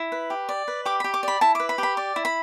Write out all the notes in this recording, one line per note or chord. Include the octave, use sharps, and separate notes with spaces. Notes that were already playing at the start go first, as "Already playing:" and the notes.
Already playing: E4
B4
G4
D5
B4
G4 D6
G4 B5
D6
D5 B5
E4 A5
B4 D6
B5
G4
B5
D5 D6
E4
B5